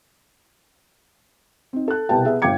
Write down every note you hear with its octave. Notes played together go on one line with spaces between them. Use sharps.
C4 D#4
A4 F#6
C2 B2 G4 G5 A5
B3 G#4 E5
G1 F5 G5 D6 G#6 C#7